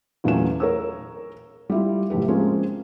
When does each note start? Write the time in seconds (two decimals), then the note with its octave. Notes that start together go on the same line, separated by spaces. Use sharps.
0.24 E2 A#2 F#3 A3 C#4 E7
0.60 A#4 C#5 E6
1.70 G3 E4 F4
2.10 F#1 A2 A3 G4 B4
2.28 F3 G#3 A#3 C4 C#4